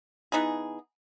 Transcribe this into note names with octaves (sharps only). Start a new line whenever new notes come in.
E3 B3 D#4 G#4